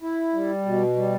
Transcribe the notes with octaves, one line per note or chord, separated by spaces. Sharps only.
E4
G3
B2
G3